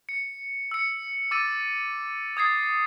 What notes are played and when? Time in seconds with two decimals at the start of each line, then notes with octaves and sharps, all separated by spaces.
0.09 C#7
0.71 E6 C#7
1.31 D6 E6 A6 D#7
2.37 D#6 G#6 A6 C7